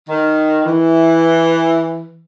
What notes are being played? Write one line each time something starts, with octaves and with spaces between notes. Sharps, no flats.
D#3
E3